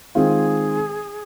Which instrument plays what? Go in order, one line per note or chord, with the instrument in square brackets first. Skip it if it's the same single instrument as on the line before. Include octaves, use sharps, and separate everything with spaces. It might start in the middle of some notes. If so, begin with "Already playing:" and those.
[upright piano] D#3 G#3 C4 F4 [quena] G#4